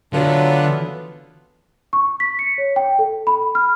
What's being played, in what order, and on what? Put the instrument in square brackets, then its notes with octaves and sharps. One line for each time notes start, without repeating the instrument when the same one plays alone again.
[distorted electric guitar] D3 [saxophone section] E3 A3 B3 [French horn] F#3 [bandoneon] D4 F4
[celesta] C#6
B6
C#7
C#5
G5
A4
B5
F6